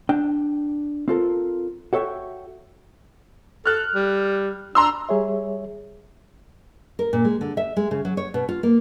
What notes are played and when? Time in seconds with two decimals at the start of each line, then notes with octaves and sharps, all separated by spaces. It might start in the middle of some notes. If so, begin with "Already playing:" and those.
0.09 D4 G5
1.08 C4 F4 A4 A#4
1.93 F#4 A4 C#5 E5 G5
3.66 A4 F6 F#6
3.95 G3
4.75 D4 A#5 C6 E6
5.09 G3 G#4 C#5 E5
6.99 A#4
7.13 A#2
7.25 G#3
7.41 D3
7.57 E5
7.76 G#3
7.91 C#3
8.05 F#3
8.17 C#5
8.34 B2
8.49 F4
8.63 A#3